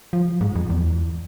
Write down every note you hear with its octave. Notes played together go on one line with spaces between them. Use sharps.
F3
G#2
F2
E2